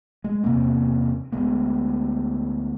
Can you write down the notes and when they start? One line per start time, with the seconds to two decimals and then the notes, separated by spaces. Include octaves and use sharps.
0.24 G#3
0.44 E2 C3 A#3 C4
1.32 D2 G#3 B3